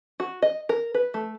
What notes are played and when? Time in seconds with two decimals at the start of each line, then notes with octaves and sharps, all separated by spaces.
0.20 F#4
0.42 D#5
0.69 A#4
0.95 B4
1.14 A3